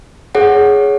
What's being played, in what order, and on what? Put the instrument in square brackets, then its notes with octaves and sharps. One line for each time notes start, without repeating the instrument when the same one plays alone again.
[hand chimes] G#4 C#5 F#5